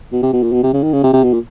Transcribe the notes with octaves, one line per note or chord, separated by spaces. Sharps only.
B2
C3
B2
A#2
B2
C3
C#3
D#3
C#3
C3
C3
B2
A#2